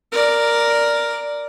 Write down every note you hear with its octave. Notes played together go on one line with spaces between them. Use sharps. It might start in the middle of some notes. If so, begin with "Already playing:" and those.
A#4 D5